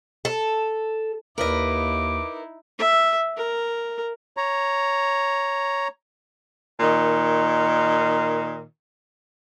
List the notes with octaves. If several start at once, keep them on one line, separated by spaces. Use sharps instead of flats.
A4
D#2 D#4 E4 A#4 B4 D#5 D6
E5
A#4
C#5 A#5
A#2 D#3